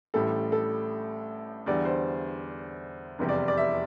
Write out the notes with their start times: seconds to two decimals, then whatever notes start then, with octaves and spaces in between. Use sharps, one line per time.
0.14 A1 A2 G3 A4
0.52 A4
1.66 E2 D3 G3 D5
1.85 C5
3.19 F1 E2 C3 G3
3.29 D5
3.48 D5
3.57 E5